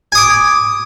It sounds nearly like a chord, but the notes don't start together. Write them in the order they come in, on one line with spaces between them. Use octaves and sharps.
G#5 D#6 D6